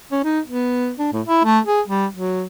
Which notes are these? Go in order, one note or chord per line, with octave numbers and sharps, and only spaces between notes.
C#4
D#4
B3
D4
A2
E4
A3
G#4
G3
F#3